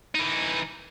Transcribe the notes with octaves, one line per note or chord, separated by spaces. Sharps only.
E3 D#4